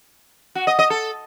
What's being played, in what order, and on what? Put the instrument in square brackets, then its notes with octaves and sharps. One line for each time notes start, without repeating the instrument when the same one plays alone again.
[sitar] F#4
D#5
D#5
A4